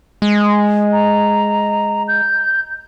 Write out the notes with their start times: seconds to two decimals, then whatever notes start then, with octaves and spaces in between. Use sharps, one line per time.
0.22 G#3
0.93 A#5
2.08 G6